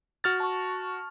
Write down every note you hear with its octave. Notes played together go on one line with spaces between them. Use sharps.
F#4 F6 A6
A5 C#6